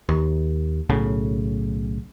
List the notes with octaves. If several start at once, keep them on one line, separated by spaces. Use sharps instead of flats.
D#2
B1 A2 C#3